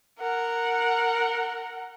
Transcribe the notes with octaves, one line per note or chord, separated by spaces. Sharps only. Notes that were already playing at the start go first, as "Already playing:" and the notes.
A#4 F#5